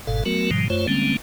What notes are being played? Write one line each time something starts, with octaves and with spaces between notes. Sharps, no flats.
G1 G#2 B2 A4 F5
F#3 A3 B3 F#4 A#4
G#2 B2 D#3 F3 G3
F#2 A3 F4 C5 C#5
D3 G3 G#3 A#3 C4 C#4